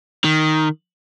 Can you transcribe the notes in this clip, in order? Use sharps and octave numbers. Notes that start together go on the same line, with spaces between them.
D#3